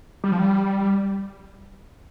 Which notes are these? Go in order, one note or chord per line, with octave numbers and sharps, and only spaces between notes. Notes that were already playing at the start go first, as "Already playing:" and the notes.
G3
F3
G3